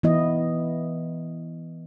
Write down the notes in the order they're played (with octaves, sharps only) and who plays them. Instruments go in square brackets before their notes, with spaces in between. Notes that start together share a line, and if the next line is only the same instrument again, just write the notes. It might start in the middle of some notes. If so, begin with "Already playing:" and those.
[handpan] E3 B3 E4 D#5